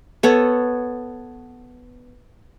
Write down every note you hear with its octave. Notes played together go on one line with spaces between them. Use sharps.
B3 A4 C#5